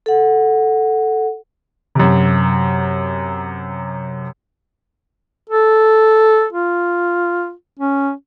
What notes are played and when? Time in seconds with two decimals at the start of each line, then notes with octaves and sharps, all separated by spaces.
0.06 A4 F#5
1.95 F#2 C3
5.50 A4
6.53 F4
7.80 C#4